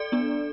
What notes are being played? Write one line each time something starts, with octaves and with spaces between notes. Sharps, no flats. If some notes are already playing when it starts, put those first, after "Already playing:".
Already playing: A4 D5
B3 D4